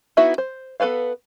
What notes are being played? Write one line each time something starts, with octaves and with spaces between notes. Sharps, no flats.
B3 D#4 E4 F#4 E5
C5
B3 A4 B4 C5 F5